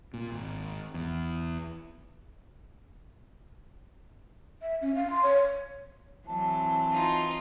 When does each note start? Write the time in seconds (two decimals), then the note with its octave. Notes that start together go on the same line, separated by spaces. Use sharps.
0.14 A#2
0.32 G#1
0.94 E2
4.62 E5
4.82 C#4
4.95 F5
5.10 C6
5.23 C#5
6.27 E3 F#3 C4 A5
6.93 D#4 F4